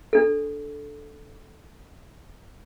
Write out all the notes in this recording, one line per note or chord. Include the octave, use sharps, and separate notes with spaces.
D4 A4